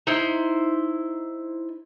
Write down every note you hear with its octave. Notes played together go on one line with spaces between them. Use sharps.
D#4 E4 C5